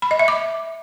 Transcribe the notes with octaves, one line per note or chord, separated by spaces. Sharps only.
B5
D#5
E5
D6